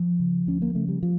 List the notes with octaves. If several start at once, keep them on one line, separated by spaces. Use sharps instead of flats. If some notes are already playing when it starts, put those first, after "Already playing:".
Already playing: F3
C#3
D2 C#4
A#3
C#3 A3
G3
F3